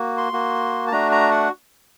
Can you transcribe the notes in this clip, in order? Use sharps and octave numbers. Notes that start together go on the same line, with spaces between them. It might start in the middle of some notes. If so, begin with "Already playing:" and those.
Already playing: A#3 F#4
C6
A#3 F#4
A5
A3 D4 F#4 A#5
A#5
F#5